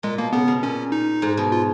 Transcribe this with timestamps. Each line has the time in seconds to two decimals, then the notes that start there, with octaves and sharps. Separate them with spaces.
0.03 A#2 G#3
0.18 B2 A#3
0.33 C#3 B3
0.48 B2
0.63 A#2 C#4
0.92 D#4
1.22 G#2
1.37 B2
1.52 F4